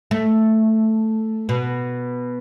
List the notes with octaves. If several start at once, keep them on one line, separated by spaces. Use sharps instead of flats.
A3
B2